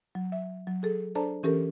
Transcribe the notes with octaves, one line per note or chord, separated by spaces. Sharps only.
F#3
E5
F#3
G#4 A4
D4 A4 C5 D5 A5 A#5
E3 C#4 G4 A4 A#4